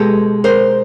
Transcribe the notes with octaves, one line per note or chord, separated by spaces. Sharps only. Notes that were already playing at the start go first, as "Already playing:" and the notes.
Already playing: B2 G#3 G4 A4
A#4 C5